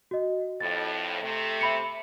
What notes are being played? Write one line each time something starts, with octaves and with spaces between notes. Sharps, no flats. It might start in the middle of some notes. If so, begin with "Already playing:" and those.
F#4 D#5
F2 A2 A6
C3 A3
E5 B5 C#7